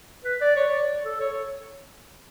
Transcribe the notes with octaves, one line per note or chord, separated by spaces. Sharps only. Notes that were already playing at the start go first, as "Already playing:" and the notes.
B4
D5
C#5
D5
A4
C#5